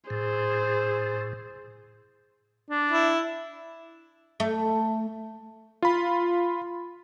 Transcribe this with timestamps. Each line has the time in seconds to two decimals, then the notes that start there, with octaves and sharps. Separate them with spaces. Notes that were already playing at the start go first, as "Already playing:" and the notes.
0.10 A2 G#4 C5
2.70 D4
2.91 E4
4.40 A3
5.82 F4 B5